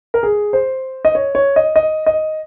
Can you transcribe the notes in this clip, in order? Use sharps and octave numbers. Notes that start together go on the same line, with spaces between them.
A#4
G#4
C5
D#5
C#5
C#5
D#5
D#5
D#5